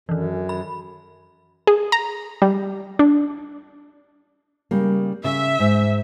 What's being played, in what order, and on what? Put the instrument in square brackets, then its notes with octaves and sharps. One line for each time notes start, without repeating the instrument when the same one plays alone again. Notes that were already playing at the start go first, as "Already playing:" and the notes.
[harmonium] F#2 [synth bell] D#3 E3
[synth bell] B5
[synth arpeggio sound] G#4
A#5
G3
D4
[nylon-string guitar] C#3 G3 A#3
[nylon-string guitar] C#3 [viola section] E5
[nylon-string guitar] G#2